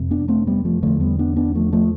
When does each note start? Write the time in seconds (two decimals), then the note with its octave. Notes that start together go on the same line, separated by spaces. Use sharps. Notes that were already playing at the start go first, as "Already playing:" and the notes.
Already playing: F2 C3
0.11 B3 D4
0.28 A3 C4
0.47 G3 B3
0.65 F3 A3
0.83 E2 D3 F3 A3
1.00 G3 B3
1.19 B3 D4
1.36 B3 D4
1.55 F3 A3
1.73 F3 A3